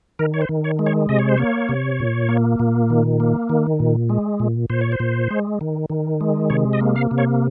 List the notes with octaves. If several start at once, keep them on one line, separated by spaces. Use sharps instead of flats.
D#3 A#4
C#5
C5
D#3
C#5
G#3
C#5
C3 D#5
C#5
C5
A#3 C#5
C3
A#2
A#3
A#2
D#3
A#3
D#3
A#2
G#3
A#2
A#2 C5
C#5
C5
A#2
G#3
D#3
D#3
G#3
C3 C#5
D#5
A#3
F5
C3
C#5